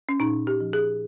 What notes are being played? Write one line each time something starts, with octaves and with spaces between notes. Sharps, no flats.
C#4
A#2 D#4
G4
F3
G#4